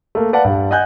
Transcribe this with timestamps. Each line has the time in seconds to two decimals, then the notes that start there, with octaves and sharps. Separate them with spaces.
0.15 A3 A#3
0.33 B4 D5 F5 F#5 A5
0.45 G2
0.71 D#5 F#5 G#5 F#6 G6